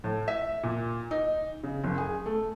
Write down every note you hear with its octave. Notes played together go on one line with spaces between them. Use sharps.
A2
E5
A#2
D#4
C#3
F#1
G#4
A3